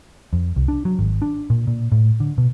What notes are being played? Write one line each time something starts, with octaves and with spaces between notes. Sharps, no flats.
F2
C2
D4
F#3
G#1
D4
A#2
A#2
A2
D3
B2